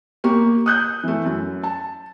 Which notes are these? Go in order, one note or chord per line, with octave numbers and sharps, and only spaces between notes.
A#3 G4 C#6
D#6 F#6 G6
E3 A3
F#2
A5